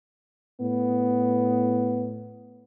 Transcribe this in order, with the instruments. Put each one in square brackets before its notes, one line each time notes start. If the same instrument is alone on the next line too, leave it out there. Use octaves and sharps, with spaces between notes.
[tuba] A2 [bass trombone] B3